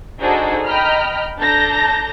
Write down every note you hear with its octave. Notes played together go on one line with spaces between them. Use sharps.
D4 D#4 F#4 G#4 A4 C5
D#5 G5 A#5 B5 F6
D4 A4 A5 A#5 G6 A#6